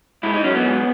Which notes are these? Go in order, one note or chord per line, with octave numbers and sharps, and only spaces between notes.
G#2 E4
D#4
F#3 C#4
B3
G#2